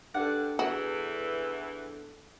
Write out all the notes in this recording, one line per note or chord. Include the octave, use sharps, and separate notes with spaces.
G2 D4 A4 D5 F#5
E2 E3 F#4